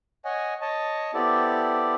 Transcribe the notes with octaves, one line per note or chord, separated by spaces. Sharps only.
C#5 D#5 F#5 G#5
C#5 D#5 A5
B3 C4 E4 G4 A4 D5